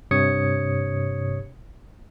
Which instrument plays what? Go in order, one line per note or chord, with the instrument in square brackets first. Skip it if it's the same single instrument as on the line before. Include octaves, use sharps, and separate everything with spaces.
[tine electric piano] G2 C3 C#5 D#6 G#6 C#7